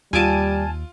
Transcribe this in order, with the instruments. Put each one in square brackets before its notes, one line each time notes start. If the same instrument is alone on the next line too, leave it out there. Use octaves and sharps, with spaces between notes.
[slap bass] D#2 [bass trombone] G3 [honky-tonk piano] F4 D7 D#7 [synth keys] G#5 A5